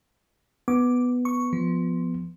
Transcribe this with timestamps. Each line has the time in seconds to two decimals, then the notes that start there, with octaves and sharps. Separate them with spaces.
0.68 B3 D6
1.25 C#6
1.53 F3